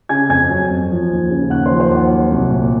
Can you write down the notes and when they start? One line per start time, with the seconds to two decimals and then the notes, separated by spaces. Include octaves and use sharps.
0.09 C#3 G#5 G#6
0.29 F2 G#5 G#6
0.50 F#3
0.70 F2
0.91 F3
1.10 D#2
1.30 C#3
1.50 D#2 F#5 F#6
1.66 F3 C5 C6
1.80 C5 C6
1.90 D#2
1.96 F#5
2.10 F#3
2.31 C2
2.50 A#2